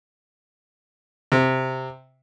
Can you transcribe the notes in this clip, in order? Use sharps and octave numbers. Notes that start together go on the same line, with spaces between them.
C3